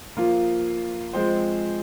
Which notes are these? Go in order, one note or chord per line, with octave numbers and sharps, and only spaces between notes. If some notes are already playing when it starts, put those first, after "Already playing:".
F3 A#3 F4
F3 G#3 C4 G#4 C5